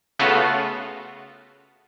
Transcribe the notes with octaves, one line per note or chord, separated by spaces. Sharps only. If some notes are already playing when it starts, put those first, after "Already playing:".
C#3 A3 B3 F4 F#4 A4